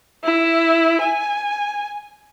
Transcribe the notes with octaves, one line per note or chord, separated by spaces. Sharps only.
E4
G#5